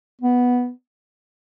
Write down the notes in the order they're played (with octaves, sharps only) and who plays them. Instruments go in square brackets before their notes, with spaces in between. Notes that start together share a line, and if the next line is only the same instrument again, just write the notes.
[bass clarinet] B3